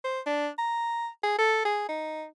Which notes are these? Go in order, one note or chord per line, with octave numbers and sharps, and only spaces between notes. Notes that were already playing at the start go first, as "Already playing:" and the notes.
C5
D4
A#5
G#4
A4
G#4
D#4